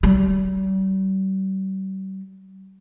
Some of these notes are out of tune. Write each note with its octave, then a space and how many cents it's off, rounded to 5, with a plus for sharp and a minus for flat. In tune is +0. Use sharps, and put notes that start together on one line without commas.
G3 -40